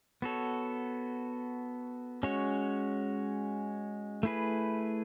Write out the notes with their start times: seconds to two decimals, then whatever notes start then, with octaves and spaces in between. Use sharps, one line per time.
0.22 B3 F#4 A4 C#5
2.23 G#3 C#4 F#4 C#5
4.23 A3 E4 G#4 B4